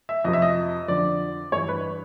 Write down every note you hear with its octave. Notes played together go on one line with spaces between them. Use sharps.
E5
F2 C3 F3 D#5
E5
D#5
F2 D3 F3 D5
G2 E3 C#5
B4